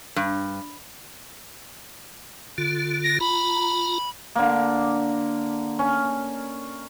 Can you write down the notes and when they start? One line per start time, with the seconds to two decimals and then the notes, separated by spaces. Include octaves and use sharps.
0.16 G2
2.58 D3 F4
3.04 A#6
3.20 F4 A#5 B5
4.36 D3 A#3
5.79 C#4